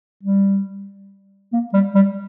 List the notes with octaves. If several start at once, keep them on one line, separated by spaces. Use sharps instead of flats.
G3
A#3
G3
G3